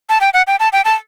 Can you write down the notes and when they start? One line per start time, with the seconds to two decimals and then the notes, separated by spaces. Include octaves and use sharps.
0.09 A5
0.21 G5
0.34 F#5
0.47 G5
0.60 A5
0.73 G5
0.85 A5